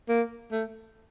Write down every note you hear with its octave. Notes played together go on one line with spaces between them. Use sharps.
A#3
A3